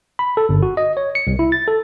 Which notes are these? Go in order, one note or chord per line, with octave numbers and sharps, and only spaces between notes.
B5
A4
G1
F#4
D#5
C#5
C#7
C2
E4
A6
A4